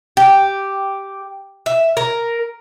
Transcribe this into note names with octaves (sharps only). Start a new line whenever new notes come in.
G4
E5
A#4